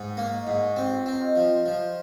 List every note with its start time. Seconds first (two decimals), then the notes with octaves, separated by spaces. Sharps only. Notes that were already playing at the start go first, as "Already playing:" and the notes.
Already playing: G#2
0.10 G5
0.17 A#3
0.23 C#5
0.32 D#5
0.47 G#2
0.55 G#4
0.76 C4 G4
0.88 F4
0.99 G4
1.06 C4
1.13 D#4
1.21 F4
1.36 F3
1.66 F3 F4